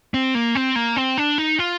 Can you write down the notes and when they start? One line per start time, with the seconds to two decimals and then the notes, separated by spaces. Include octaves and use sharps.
0.14 C4
0.35 A#3
0.55 C4
0.76 A#3
0.97 C4
1.18 D4
1.38 D#4
1.59 F4